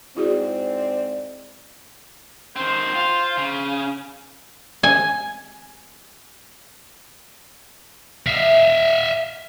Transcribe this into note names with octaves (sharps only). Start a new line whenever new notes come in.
G#2 C4 E4 F#4 G#4 D5
D#3 C4 C5
F4
C#3
G#5
E5 F5